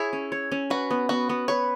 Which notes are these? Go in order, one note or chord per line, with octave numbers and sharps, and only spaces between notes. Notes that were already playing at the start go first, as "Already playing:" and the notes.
Already playing: E4 G#4 C#5
C#4
C#5
C#4
F#4 B4
B3
B3 F#4
B3
B4 C#5